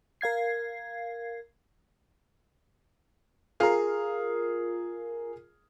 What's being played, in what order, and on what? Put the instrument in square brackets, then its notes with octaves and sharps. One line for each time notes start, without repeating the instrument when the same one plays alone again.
[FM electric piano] A#4 F5 G#6 C7
[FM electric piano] F4 A#4 [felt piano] G#4 F6 C7